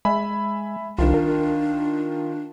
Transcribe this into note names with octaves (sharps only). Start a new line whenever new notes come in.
G#3 E5 G#5 B5
C2 D#3 D4 F4
A#4